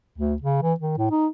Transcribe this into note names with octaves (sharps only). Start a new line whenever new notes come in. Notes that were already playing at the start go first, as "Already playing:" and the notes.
D2
C#3
E3
D#3
A2
D#4